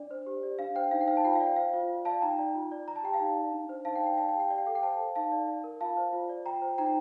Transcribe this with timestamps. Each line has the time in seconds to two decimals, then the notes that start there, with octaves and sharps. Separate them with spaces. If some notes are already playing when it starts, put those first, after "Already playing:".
Already playing: D4 D5
0.11 C5
0.26 G4
0.43 D5
0.59 D4 F5
0.76 C5 G5
0.91 D#4 F5
1.01 G5
1.08 C5 F5
1.17 A5
1.25 F4 G5
1.35 F5
1.40 D5
1.46 G5
1.56 C5 F5
1.73 F4
1.90 F4
2.05 D5 F5 A5
2.22 D#4 G5 A#5
2.39 D5
2.55 F4
2.72 D5
2.88 D5 A#5
2.96 A5
3.03 G4 G5
3.13 F5 A5
3.20 D#4
3.37 D5
3.52 D4
3.69 C5
3.85 D#4 F5 A5
3.95 G5
4.01 D5
4.07 G5
4.18 D5 F5 A5
4.29 G5
4.34 G4
4.40 G5
4.50 D5 F5
4.58 G5
4.66 A4 F5
4.75 G5
4.82 C5 F5 A5
4.99 A4
5.15 D#4 F5 A5
5.32 D5
5.48 D5
5.64 A#4
5.81 F4 F5 A5
5.97 C5
6.13 F4
6.29 D5
6.46 F4 G5 A#5
6.62 C5
6.78 D#4 G5 A#5